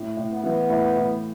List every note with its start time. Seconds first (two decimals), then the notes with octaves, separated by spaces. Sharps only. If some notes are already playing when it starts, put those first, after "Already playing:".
Already playing: A2
0.17 A2
0.31 B3
0.44 E3
0.70 A2
0.96 A2